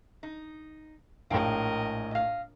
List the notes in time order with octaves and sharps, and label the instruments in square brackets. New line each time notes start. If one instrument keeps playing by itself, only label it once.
[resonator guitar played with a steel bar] D#4
[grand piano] A#1 A2 [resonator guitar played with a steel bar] G#3 F5 G5 [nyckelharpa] A#4 D#5
[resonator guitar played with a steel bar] D#5 F5